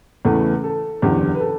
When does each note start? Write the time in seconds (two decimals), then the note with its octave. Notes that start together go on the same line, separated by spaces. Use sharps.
0.25 E2 C#3 E3 A3
0.64 A4
1.02 F#1 E2 D3 G4
1.35 B4
1.40 A4